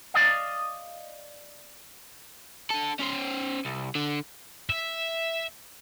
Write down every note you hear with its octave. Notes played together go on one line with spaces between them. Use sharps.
D5 D#5 F5
D3 A4
C#4 C5
C2
D3
E5